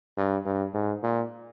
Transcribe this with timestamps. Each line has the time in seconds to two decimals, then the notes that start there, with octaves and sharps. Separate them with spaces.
0.17 G2
0.45 G2
0.74 G#2
1.03 A#2